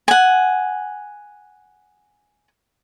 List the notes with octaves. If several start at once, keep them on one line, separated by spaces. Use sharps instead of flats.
F#5 G#5